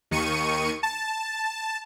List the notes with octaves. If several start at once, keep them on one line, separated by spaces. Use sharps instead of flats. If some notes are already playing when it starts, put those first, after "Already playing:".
D#2 D#3 C#6 C#7 D#7
A5